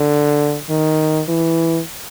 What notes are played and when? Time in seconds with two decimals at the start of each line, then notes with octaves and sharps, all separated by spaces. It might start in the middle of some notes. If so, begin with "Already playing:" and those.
Already playing: D3
0.69 D#3
1.28 E3